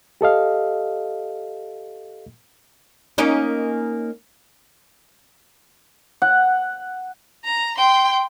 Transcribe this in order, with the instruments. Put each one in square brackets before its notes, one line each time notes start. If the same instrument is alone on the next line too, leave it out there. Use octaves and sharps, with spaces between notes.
[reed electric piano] G4 A4 D#5 F5
[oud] A#3 C#4 D#4
[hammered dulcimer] F#5
[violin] A#5
G5 C6